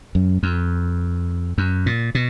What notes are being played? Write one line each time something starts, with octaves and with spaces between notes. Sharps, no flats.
F#2
F2
F#2
A#2
B2